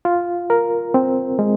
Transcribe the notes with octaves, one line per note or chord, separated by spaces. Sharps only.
F4
A#4
C4
G#3